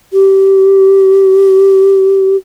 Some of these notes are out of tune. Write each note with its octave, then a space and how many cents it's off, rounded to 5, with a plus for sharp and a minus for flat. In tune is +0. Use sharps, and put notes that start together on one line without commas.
G4 -20